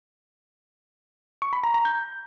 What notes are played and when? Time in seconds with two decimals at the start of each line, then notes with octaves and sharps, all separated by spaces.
1.42 C#6
1.53 B5
1.64 A#5
1.74 A#5
1.85 G6